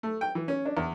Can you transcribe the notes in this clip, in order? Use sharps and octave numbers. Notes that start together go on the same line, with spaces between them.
A3
G5
E3
C#4
D4
E2